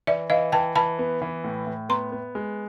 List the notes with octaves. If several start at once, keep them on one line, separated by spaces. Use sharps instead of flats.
E3 D5 E5
E3 D#5 F5
E3 G5 A5
E3 A5 B5
B3
E3
A2
A2
B3 A#5 C6
B3
G#3